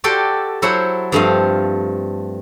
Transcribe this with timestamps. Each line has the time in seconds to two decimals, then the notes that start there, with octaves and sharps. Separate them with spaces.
0.04 F#4 G4 A4 D5 C6
0.62 F#3 E4 A4 C5 C#5 F#5
1.12 G2 F3 A3 C4 D#5 F5